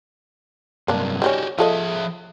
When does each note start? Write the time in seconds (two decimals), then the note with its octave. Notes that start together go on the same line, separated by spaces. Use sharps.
0.88 G2 C3 F#3 A#3 D4
1.22 D#3 G3 C#4 F#4 G4
1.58 F3 F4 G#4 A4 D#5 E5